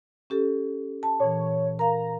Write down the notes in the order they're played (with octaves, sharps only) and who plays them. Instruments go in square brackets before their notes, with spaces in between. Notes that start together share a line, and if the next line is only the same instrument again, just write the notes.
[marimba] C#4 G4 A4
A5
[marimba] A#2 E3 [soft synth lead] C#5
[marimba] A#4 F5 [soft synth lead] A#5